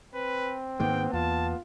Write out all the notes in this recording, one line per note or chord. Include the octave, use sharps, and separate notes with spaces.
C4 B4
G#2 D#3 G#3 A#3 B3 G5
E2 F4 A5